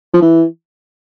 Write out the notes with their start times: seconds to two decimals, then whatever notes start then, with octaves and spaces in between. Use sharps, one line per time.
0.13 F3
0.22 E3